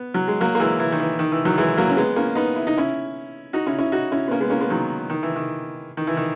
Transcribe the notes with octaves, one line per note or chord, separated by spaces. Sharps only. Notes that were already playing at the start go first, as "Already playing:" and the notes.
Already playing: B3
F#3
G#3
F#3 A#3
A#3
E3 G#3
E3
D#3
E3
D#3
E3
D#3 F#3
E3 G#3
F#3 A#3
C#4
G#3 B3
A#3 C#4
B3 D#4
E4
D#4
C#4 E4
D#4 F#4
C#4 E4
C#4 E4
D#4 F#4
C#4 E4
B3
A#3 C#4
G#3 B3
A#3 C#4
G#3 B3
D#3 F#3
D#3
E3
D#3
D#3
E3
D#3